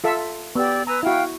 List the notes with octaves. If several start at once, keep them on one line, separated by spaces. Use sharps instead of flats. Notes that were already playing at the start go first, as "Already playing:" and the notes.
F4 A4 E5
B3 G4 D5 E6
B4 G#5 A#5 E6
E4 F#4 F5 G5